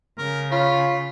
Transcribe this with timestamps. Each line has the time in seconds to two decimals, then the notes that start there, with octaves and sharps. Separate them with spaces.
0.18 C#3 A#4
0.52 F4 C#5 B5